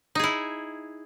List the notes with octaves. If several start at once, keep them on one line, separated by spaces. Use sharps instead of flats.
D#4 E4 G#4